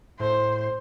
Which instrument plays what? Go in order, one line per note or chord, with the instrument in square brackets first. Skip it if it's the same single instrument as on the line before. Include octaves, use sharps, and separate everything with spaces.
[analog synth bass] A2 [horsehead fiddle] C5